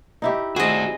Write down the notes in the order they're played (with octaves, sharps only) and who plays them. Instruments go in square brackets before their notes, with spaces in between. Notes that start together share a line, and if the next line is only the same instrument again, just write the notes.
[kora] D#4 E4 G4
[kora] C4 [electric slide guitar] F#4 C5 [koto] G#4 D#5